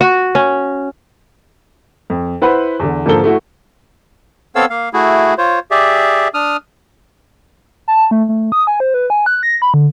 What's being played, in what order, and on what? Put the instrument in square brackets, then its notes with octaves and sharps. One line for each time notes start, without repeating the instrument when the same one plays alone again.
[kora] F#4
C#4
[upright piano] F2
E4 B4 C5 F#5 B5
E2 D3
G#2 D3 F3 A#3 A4 G7
A3 E4 F#4
[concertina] B3 C4 A4 C#5 F5 E6
A#3 F5
A3 E4 F#4 G#4
F4 C5 C#5
G4 G#4 D5 E5
D4 D#6 F6
[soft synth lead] A5
A3
A3
D#6
G#5
C5
B4
G#5
F#6
A#6
B5
D3